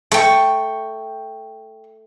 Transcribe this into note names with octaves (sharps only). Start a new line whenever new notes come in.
A3 G5 C#6